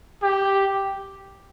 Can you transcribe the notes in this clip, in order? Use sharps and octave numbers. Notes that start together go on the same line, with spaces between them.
G4